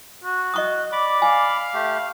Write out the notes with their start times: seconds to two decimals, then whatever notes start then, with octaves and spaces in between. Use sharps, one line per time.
0.24 F#4
0.54 D#5 C#6 D#6
0.92 D5 B5 D6
1.22 F5 G#5
1.74 A3 G4